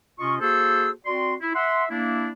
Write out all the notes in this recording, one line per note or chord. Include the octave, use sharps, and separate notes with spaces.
C3 C#4 F4 D#5 C#6
A#3 F#4 G#4 A4 C5 E6
C4 F#4 D5 C6
E4
E5 F#5 C6
A#3 D4 E4